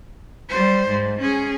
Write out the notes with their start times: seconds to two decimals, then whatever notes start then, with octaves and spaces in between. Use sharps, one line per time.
0.49 G3 C5
0.88 G#2
1.20 C#4 G#4